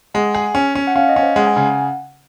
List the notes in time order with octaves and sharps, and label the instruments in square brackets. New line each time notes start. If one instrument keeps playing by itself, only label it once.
[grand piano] G#3 [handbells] F#5
[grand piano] G#4
C#4
C#4
[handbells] F#5
[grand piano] C#4 [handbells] F5
[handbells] D#5
[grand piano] C#4
[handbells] C5
[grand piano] G#3 [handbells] F#5
[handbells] G#5
[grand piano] C#3 [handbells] F#5